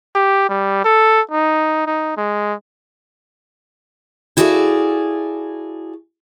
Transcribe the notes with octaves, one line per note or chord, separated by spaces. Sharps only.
G4
G3
A4
D#4
D#4
G#3
E4 F#4 G#4 A4 D5 F5